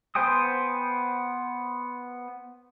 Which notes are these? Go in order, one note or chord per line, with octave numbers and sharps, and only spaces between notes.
B3 C5 G5 G#5 D#6